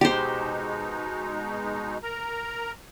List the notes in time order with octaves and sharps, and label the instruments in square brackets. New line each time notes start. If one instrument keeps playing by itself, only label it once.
[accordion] B2 G#3 D#4 [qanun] G4 C5
[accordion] A#4 A#5